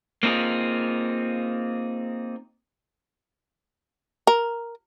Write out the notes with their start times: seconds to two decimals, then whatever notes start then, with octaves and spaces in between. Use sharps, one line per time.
0.23 A#3 C4 D#4 F4 G#4
4.27 A#4